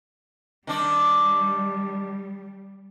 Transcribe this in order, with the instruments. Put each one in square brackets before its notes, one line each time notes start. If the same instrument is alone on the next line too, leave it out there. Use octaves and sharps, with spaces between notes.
[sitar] D#3 D4 D5 [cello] G3